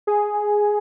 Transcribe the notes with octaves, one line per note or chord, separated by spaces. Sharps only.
G#4